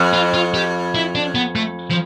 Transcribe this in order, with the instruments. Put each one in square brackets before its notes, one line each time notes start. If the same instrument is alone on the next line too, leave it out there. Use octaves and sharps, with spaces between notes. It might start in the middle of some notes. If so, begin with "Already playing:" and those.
Already playing: [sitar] F2
[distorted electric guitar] F4
F4
G4
E4
D4
B3
A3
F3